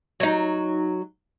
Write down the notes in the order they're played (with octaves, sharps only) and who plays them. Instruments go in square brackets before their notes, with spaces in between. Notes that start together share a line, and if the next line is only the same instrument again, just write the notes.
[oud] F#3 D#4